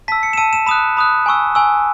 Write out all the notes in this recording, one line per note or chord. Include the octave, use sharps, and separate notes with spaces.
A5 E6 B6
C#7
E7
A5 E6 D#7
E7
B5 D#6 F#6 E7
B5 D#6 F#6
G#5 C#6 E6
G#5 C#6 E6